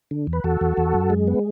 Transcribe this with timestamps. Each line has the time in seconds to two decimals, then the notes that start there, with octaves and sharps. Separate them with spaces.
0.11 D3
0.27 E2
0.33 B4
0.44 E2 F#4 A4
0.61 E2
0.77 E2
0.94 F#2
1.10 G#3
1.28 B3